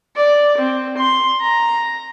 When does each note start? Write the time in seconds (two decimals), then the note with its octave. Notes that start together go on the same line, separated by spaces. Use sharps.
0.15 D5
0.57 C4
0.97 C6
1.41 A#5